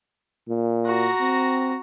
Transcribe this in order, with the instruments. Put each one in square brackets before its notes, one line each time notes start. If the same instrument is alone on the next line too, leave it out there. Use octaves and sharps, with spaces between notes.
[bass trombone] A#2
[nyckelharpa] F#4 A#5
[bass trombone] C4